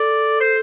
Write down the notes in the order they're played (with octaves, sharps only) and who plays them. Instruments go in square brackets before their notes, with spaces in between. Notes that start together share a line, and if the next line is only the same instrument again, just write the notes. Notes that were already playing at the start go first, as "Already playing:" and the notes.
Already playing: [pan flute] A4 [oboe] D5
[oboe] C5